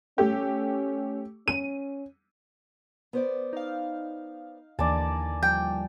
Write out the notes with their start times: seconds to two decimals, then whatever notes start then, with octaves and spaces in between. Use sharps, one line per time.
0.18 A3 C#4 G4
1.48 C#4 D#7
3.13 B3 C5 D5
3.53 D#4 F5
4.79 D#2 D3 E3 A#3 D#4 D5 G#5 A5
5.43 F3 G3 G5